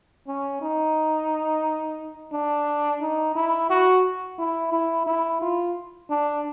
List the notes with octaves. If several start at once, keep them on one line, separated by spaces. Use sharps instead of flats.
C#4
D#4
D4
D#4
E4
F#4
E4
E4
E4
F4
D4